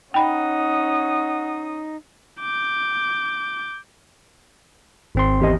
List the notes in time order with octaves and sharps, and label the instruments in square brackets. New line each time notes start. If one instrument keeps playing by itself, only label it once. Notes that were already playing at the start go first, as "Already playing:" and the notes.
[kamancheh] C#4 D#6 [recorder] D#4 [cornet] F#5 [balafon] G5 B5
[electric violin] D6 G6
[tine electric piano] G#1 C4 C6
[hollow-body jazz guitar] E2 G4 D#5